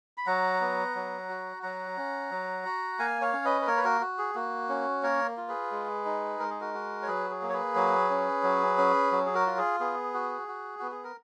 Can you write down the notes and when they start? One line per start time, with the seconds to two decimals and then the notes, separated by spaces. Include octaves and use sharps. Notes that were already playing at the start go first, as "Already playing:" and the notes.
0.18 B5
0.27 F#3 F#5 A#5
0.61 B3
0.95 F#3
1.29 F#4
1.63 F#3 F#5 A#5
1.97 C#4
2.31 F#3
2.66 F#4
2.99 A#3 F5 G#5
3.21 C#5 F5
3.33 C#4
3.45 B4 D#5
3.62 B4
3.67 A#3 A#4 C#5
3.77 B4
3.84 F#4 A#4
4.01 F#4
4.18 G#4
4.35 A#3 F#4
4.69 C#4
5.03 A#3 A#4 C#5
5.37 F4
5.48 G#4 B4
5.71 G#3
6.05 D#4
6.40 G#3 A#4
6.50 G#4
6.61 F#4 A#4
6.74 F#4
7.03 C#5
7.07 F#3 G#4 B4
7.30 G#4
7.42 A#3
7.49 C#5
7.53 G#4 B4
7.75 F#3
8.10 C#4
8.43 F#3
8.78 C#4
9.12 F#3
9.26 G#4
9.34 F#4 A#4
9.46 F4
9.57 G#4
9.80 B3 G#4
10.14 F#4
10.48 F#4
10.79 B3 F#4
10.91 G#4
11.04 A#4